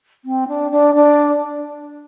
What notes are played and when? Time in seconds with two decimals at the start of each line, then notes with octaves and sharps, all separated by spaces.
0.25 C4
0.48 D4
0.71 D4
0.95 D4